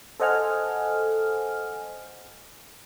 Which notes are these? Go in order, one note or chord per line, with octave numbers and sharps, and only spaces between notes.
A4 C5 D#5 F#5 G#5 F6